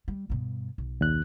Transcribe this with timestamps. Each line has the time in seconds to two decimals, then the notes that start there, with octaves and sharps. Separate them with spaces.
0.08 G3
0.30 G2 B2
0.78 B1
1.01 D#2 F#6